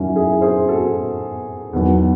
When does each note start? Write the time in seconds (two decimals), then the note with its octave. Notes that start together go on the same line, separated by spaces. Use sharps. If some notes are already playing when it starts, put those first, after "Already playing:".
Already playing: F#2 D#3 F#3 C#4 E4
0.16 E4 G#4
0.41 G#4 C5
0.68 F#4 A4
1.73 E2 D#3 F#3